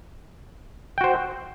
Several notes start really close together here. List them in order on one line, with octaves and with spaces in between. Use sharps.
G5 F#4 C5